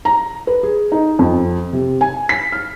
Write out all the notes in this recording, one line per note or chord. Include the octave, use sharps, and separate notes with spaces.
A#5
B4
G#4
D#4
F2
C3
G#5
B6
F6